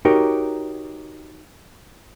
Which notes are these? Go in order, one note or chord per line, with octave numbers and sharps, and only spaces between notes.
D#4 F#4 G4 A#4 C#5